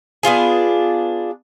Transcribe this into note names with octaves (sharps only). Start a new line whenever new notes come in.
B3 D4 F4 G#4